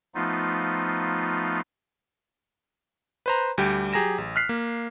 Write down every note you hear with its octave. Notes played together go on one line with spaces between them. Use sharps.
F3 A3 B3 D#4 F4
B4 C5 A#5
D2 G3 G4 G5
F#3 G4 G#4 A#5 A#6 E7
A1
F6 F#6 B6 C7
A#3